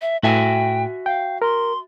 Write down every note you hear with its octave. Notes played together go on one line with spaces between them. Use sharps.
E5
A2 F#4 E5 G5 G#5
F5 G5
A#4 C6